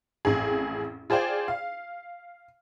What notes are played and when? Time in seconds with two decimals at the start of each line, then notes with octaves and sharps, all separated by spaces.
0.25 A1 F2 G#4
1.10 F4 G#4 C5 D5 G5
1.48 F5